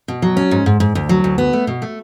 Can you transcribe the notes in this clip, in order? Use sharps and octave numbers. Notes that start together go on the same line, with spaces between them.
B2
F#3
C#4
G#2
G#2
G#2
D2
F#3
D2
B3
A3
B2
A3